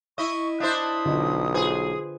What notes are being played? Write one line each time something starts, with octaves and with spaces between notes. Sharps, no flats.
E4 D#5 C#6
D4 E4 C5 D#6
B1 D3 F4 D#5
F4 G#4 B4 C5